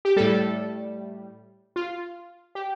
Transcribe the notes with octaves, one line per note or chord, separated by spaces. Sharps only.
G4
A2 G3 A4
F4
G4